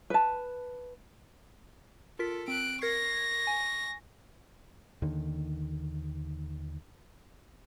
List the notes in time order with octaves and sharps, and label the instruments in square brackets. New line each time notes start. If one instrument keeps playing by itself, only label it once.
[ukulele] B4 A5
[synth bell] F4 A#4 B6 [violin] A4
[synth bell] C4 [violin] F#6 D7
[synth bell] A#4 G#6 C7 [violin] C#6 A#6
[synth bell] G#5
[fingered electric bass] D#2 D3 D#3